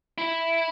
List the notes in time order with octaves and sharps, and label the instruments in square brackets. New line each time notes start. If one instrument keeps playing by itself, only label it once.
[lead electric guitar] E4